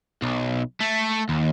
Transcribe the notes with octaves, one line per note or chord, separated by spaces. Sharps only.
B1
A3
D#2